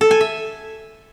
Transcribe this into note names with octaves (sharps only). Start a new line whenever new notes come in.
A4
G#5
E5